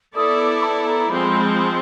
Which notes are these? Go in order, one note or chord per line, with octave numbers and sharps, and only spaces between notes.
B3 E4 A4 D5 D#6
D6
A5
A#5
F3 G#3 C4 B5
B5